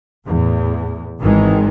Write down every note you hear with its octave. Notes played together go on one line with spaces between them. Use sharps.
E2 A2
G#1 G#2 D#3 E3 G#3